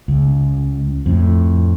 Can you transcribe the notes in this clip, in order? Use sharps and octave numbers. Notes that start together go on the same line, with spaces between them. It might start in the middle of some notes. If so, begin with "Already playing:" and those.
C#2
F2 A2